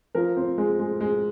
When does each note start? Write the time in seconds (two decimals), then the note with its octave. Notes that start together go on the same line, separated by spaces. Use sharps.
0.15 F3 A#4
0.36 C4
0.58 G#3
0.79 G#3
1.01 G#3